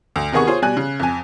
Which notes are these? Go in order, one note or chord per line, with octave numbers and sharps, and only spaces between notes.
D2
C3 D#3 B3 G#4 F#5 C#6
F4 G#4 C5 C#5
B2 G3 G#5 F#6
C#3
F2 G#5